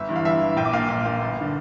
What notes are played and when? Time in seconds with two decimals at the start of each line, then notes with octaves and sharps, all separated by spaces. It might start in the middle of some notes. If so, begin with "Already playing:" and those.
Already playing: G1 E5
0.09 G2 E3
0.16 F5
0.25 G1 E5
0.41 G2 E3
0.57 A#1 G5
0.65 D6
0.73 A#2 F5
0.89 A#1 F5
1.05 A#2
1.22 G1
1.41 D3